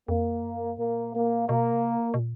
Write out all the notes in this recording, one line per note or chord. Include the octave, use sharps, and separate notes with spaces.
F2 A#3
F#2
A#2 A#3
A#3
B2 A#3
C3
B2
A#2